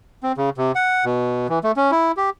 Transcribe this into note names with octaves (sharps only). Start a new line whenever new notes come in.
C4
C#3
C3
F#5
B2
E3
A3
C#4
E4
G4